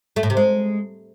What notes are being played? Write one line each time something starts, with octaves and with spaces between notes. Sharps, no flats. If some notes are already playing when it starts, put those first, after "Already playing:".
A3
A2
C3
G#3